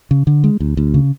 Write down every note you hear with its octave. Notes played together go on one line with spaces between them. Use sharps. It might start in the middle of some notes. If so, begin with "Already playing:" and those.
C#3
D3
G#3
D2
D2
C#3